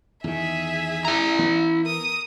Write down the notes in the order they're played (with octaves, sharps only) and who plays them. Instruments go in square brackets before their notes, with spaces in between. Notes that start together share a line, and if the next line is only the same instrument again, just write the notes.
[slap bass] E2 D#3 [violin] G#4 E5
[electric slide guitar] E4 A#5
[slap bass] E3 B3
[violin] A#4 D#6